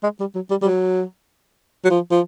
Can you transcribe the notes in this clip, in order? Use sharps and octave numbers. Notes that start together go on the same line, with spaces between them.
G#3
G3
F#3
G3
G3
F#3
F#3
F3
F3